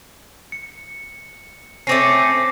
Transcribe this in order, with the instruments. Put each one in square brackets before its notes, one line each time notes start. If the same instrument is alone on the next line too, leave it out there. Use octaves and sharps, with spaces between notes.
[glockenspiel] C#7
[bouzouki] A3 C4 C#4 [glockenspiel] D6 A#6 C7